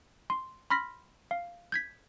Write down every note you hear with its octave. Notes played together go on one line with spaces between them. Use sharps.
C6
B5 C6 F6 A#6 B6
F5
G6 G#6 B6